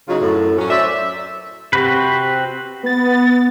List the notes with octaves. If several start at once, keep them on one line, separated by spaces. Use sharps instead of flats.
C#3 F#3 D#4 F4 F#4
F#2 A2
F#3 C#4
C5 D5 E5
C3 C4 F#4 B4
B3 A6